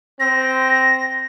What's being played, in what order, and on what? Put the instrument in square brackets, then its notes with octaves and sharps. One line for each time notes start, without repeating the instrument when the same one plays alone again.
[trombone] C4 [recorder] A#6